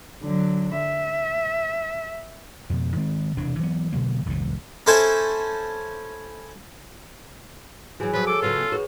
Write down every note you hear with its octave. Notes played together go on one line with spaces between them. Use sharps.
D3 F#3
E5
F2 B2
D#3 G#3 C4
E1 C3 E3 D4
E3 F#3 B3
B2 D3 F#3 A#3
E1 C#2 F#2 A2
C#4 E4 A4 C5 G#5 A5
E3 F#3 F#4 G#4 G#5
F3 F#3 B4 C#5
A4 D6
C#3 F#3 B3 F4
F#4 G#4 B4 C#5